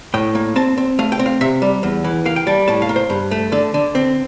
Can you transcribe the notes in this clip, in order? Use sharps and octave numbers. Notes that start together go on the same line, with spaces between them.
A2 G5
A#3
C4 A5
C4
A3 F5
G5
C4
F5
C3 E5
G3
E2
E3
A#3 F5
G5
G3 A5
A2 A5
F5
A#3
C5
G2
A3
D3 A4
D3
C4